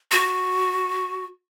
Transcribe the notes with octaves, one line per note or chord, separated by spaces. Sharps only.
F#4